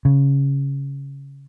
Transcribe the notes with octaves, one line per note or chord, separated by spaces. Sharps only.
C#3